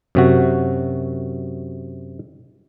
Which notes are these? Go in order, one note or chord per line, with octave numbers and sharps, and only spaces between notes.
F#2 C3 F#4